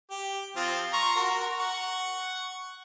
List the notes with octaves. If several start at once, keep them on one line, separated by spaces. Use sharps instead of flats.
G4
F3 C4 F4
A#5 C6 C#6
F#4 A#4
F#5 C#6